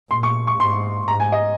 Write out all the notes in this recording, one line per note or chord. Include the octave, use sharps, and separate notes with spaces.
A#2 C6
C#6
C#6
G#2 C6
G#2 A#5
G#5
D#5